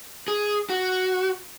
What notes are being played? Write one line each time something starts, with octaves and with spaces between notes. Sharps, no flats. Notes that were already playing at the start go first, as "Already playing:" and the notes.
G#4
F#4